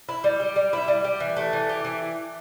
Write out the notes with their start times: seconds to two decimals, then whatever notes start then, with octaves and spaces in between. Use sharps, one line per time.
0.09 E4
0.24 G3
0.40 G4
0.56 G3
0.73 E4
0.88 G3
1.04 G4
1.20 E3
1.37 A3
1.53 E3
1.69 G4
1.84 E3